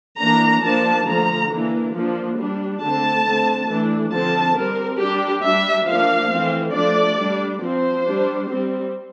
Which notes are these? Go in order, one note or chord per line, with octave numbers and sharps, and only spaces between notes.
E3 A#3 D4 A#5
F3 A#3 D4 A5
D3 F3 A3 A#5
E3 A#3 D4
F3 A#3 D4
G3 D4
D3 A3 C4 A5
D3 A3 C4
E3 A3 D4
D3 F3 C4 A5
G3 C4 A#4
G3 D4 G4
G3 D4 E5
F3 A#3 D4 F5
E3 A3 C4
F3 A3 D4 D5
G3 D4
F3 C4 C5
G3 D4
G3 C4